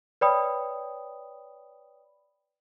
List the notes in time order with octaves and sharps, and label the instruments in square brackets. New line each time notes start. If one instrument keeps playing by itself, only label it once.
[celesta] B4 C#5 D5 G5 B5 D#6